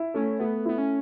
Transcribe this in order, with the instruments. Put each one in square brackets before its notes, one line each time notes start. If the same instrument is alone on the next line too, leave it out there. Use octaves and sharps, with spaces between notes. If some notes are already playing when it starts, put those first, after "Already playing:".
Already playing: [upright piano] E4
[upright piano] A3 [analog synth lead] C#4
[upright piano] A3 [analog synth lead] B3
[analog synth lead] B3 [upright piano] E4
[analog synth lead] C#4